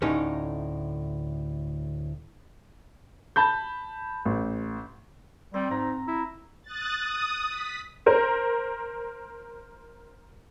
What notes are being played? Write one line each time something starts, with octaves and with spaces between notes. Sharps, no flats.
D2 A2 C#4 D#4
A5 B5 G6
A1
G3 C4
G#2 A#5
E4
D#6 F#6 A6
D#6
B6
A#4 C5